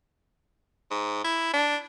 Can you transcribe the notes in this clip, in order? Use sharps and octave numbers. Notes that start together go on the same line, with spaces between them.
G#2
E4
D4